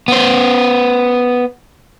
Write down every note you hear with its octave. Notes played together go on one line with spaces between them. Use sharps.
B3 C5